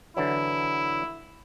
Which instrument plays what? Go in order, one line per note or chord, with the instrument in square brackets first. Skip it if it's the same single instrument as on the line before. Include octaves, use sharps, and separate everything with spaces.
[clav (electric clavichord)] D3 E3 F#3 [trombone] E4